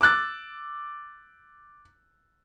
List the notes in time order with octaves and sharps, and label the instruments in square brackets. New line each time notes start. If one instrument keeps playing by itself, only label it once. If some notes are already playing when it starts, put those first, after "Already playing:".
[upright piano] D6 E6 F#6 A6